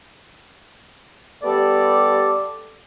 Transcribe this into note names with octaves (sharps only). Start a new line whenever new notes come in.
G3 B3 G4 A4 D5